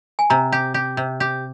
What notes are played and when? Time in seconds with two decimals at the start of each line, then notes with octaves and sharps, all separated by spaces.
0.19 G#5
0.30 C3 A#5
0.52 G4
0.74 G4
0.97 C3
1.20 G4